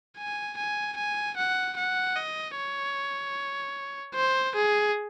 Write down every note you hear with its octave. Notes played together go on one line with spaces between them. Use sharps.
G#5
G#5
G#5
F#5
F#5
D#5
C#5
C5
G#4